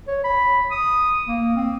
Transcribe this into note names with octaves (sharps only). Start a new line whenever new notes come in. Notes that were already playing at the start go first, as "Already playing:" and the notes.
C#5
B5
D#6
A#3
C4